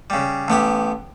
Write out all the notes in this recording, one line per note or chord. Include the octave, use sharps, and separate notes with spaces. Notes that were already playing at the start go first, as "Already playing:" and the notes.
C#3 G3
A1 B3 G4 B5